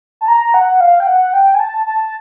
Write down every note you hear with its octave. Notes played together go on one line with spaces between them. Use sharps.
A5
A#5
F#5
F5
G5
F#5
G5
G#5
A5
A5